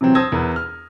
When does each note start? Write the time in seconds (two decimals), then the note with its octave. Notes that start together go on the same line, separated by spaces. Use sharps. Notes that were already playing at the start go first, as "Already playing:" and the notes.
0.01 C3 E3 F#3 C4
0.15 C5 A5 D#6 E6 G#6 A#6
0.32 E2 A#4 B4
0.56 F6